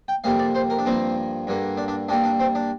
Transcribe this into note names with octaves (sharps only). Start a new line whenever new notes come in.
G5
F2 C3 G3 A#3 F5
D5
C5
A#4
D4
G2 F3 A#3 C4
G2 D3 A#3
D4
D4
G2 G3 A#3 D4
D4
C4
D4